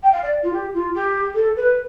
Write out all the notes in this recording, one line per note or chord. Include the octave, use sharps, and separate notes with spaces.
G5
F5
D5
F4
G4
F4
G4
A4
B4